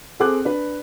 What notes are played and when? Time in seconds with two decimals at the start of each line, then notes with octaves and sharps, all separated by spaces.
0.20 C4 G#4 A4 D6 F#6
0.45 D4 B4